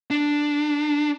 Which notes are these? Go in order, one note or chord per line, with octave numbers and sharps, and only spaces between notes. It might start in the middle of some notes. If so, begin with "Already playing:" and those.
D4